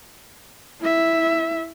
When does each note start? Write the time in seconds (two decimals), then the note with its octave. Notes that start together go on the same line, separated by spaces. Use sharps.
0.80 E4 E5